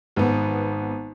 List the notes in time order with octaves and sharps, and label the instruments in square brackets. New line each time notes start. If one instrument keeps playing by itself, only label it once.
[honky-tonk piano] G#1 B3